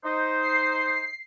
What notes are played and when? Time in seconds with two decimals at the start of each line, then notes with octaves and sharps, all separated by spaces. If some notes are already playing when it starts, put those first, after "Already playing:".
0.04 D#4 C5
0.43 C7